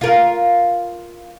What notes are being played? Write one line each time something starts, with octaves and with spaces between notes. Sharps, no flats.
F4 A#4